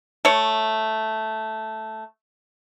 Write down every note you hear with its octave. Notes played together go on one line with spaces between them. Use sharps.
A3 C#5